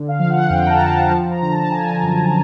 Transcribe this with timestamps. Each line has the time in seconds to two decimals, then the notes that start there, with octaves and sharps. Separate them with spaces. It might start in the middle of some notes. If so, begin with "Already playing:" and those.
Already playing: D3
0.08 F5
0.19 F3
0.30 F#5
0.50 F2 G5
0.67 A#5
0.70 A5
0.80 F3
0.90 A#5
1.11 F3 A5
1.31 A#5
1.42 D3
1.52 A5
1.72 F3 G#5
2.03 F#2